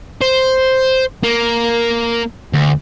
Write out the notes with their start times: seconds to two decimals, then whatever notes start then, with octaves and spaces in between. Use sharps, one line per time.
0.21 C5
1.23 A#3
2.53 D2